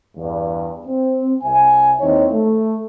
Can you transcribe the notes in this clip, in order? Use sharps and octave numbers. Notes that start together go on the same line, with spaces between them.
E2 G2
C4
C2 E5 G#5
D#2 C4 D#4 E4 C#5
A3